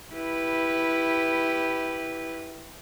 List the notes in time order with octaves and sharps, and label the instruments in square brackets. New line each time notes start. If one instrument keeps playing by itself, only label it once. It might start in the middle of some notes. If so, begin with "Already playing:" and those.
[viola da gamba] E4 G4 B4